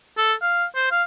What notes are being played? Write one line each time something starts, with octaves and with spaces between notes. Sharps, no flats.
A4
F5
C5
F5